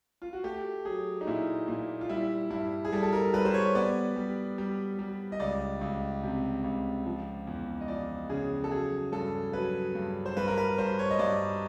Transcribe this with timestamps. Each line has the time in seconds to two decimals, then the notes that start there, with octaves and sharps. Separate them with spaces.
0.22 F4
0.33 F#4
0.44 A3 G4
0.85 F#3 G#4
1.21 D#4
1.27 A#2 E4
1.68 A#2
2.01 F4
2.09 G3 E4
2.50 G2 E4
2.85 G#4
2.92 G3 A4
3.03 A4
3.13 A#4
3.33 G3 B4
3.45 C5
3.54 C#5
3.75 B3 D5
4.16 G3
4.58 G3
4.99 G3
5.32 D#5
5.40 C#2 D5
5.81 C#2
6.23 C3
6.64 C#2
7.06 F3
7.47 E2
7.81 D#5
7.88 F3 D5
8.29 C#3 G#4
8.64 A4
8.71 F#3 G#4
9.12 G2 A4
9.53 F#3 B4
9.95 G2
10.26 C5
10.37 G2 B4
10.48 A#4
10.57 B4
10.78 G2 C5
10.99 C#5
11.11 D#5
11.19 G2 D5